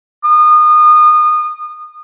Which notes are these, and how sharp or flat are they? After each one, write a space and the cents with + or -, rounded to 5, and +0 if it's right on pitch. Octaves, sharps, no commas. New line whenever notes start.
D#6 -30